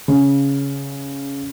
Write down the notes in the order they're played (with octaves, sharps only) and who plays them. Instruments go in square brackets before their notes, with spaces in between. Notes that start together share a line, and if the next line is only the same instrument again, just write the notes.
[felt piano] C#3